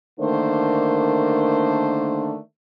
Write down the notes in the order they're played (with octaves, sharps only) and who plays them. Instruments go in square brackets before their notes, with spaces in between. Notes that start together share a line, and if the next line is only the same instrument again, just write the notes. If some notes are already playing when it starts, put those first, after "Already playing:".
[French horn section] D3 D#3 A3 A#3 D4 C5